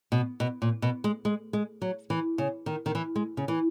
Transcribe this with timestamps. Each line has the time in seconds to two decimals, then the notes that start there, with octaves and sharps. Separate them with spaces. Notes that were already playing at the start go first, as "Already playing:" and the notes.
0.12 B2
0.40 B2
0.62 A#2
0.82 B2
1.04 G#3
1.25 G#3
1.53 G#3
1.82 F#3
2.10 E3
2.38 C#3
2.66 D#3
2.86 D#3
2.95 E3
3.15 G#3
3.37 C#3
3.48 E3